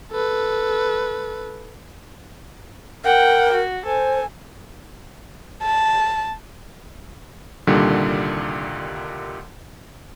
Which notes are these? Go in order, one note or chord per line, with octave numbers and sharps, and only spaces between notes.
A4 B4
A#4 F#5 G5
F#4
A4 C5 G#5
A5
C2 A#2 D3 D#3 G3